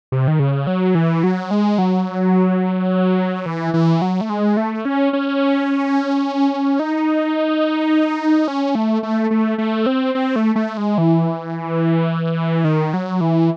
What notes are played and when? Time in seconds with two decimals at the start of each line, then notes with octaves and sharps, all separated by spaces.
0.12 C3
0.28 D#3
0.40 C#3
0.67 F#3
0.95 E3
1.23 F#3
1.51 G#3
1.78 F#3
3.46 E3
3.74 E3
4.02 F#3
4.21 A3
4.30 G#3
4.57 A3
4.85 C#4
5.13 C#4
6.79 D#4
8.48 C#4
8.75 A3
9.03 A3
9.31 A3
9.58 A3
9.86 C4
10.15 C4
10.36 A3
10.56 A3
10.77 G#3
10.98 E3
12.64 D#3
12.93 F#3
13.21 E3